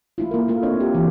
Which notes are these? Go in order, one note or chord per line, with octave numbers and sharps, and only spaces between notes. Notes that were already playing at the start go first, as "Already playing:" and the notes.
A3 E4 F4
A#3 A#4
A3 F4 A#4
C4 D4 C#5 D#5
G4
E3 F#4